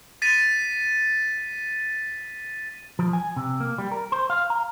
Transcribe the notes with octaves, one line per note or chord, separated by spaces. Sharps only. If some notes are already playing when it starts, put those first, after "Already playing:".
A6 B6 D#7
F3
G#5
C3
A#3
G3
A#4
C5
F5
A#5